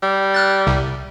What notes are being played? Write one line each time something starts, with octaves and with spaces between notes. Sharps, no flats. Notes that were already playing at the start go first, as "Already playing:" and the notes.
G3
F6 F#6 A6
C2 C3